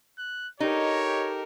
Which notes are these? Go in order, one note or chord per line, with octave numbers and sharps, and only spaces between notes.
F#6
D#4 G4 A4 A#4 C#5